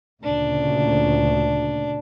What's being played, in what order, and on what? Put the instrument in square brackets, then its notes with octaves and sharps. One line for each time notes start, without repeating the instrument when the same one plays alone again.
[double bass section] D2 A#2 C#3 [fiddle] D4